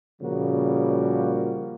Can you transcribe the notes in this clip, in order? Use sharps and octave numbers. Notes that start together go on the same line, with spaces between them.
A#2 C#3 F3 G3 A#3 F#4